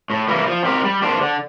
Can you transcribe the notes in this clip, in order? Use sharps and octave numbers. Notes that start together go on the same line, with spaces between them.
A2
E3 G3 A#3 E4
F3
C4 G4 A#4
G3
A#3 D4 G4 C5
D3